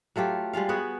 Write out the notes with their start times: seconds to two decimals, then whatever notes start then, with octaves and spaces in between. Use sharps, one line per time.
0.16 F#3 A3 F4 G4
0.53 G3 G#3 F4 F5
0.69 B3 F#4 G#4